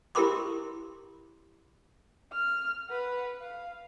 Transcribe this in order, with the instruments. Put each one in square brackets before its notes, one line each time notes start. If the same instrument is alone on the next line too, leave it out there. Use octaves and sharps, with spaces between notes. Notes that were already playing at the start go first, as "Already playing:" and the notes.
[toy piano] E4 G4 A#4 B5 C6 D6
[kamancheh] F6
B4 F#5
F5